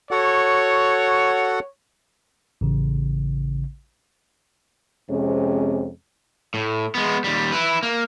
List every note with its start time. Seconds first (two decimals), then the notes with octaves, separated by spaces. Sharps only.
0.11 F#4 A4 C#5 F#5
2.61 A1 C#3
5.09 F2 C3 G#3 C#4
6.54 A2
6.95 G#3 B3
7.24 D#2 G3
7.52 E4 B4
7.83 A#3